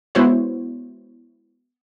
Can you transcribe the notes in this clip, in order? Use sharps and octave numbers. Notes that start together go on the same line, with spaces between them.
G#3 B3 E4 F#4 C5 C#5